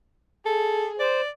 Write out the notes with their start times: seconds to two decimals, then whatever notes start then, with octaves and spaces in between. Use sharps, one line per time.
0.46 G#4 A4
0.99 C5 D5